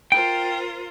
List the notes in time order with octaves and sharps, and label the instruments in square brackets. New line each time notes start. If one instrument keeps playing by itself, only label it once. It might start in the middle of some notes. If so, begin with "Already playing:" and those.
[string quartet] F4 A#4 C5 [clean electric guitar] G5